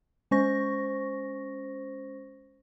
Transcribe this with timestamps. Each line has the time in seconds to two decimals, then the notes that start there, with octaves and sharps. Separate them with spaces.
0.31 G#3 C#4 C5 C#6 A#6